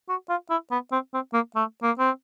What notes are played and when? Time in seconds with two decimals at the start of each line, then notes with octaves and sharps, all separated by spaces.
0.09 F#4
0.29 F4
0.50 E4
0.71 B3
0.92 C4
1.14 C4
1.34 A#3
1.56 A3
1.83 A#3
1.99 C4